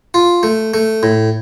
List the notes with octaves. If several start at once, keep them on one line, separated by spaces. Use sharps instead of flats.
F4
A3
A3
A2